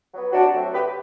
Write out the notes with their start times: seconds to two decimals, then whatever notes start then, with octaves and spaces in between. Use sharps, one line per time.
0.13 F#3 B3
0.33 C3 D4 F#4
0.52 F#3 A3 C4
0.73 C3 G4 B4